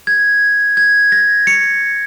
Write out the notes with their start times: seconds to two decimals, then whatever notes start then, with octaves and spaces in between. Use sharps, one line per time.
0.07 G#6
0.77 G#6
1.12 A#6
1.47 C#7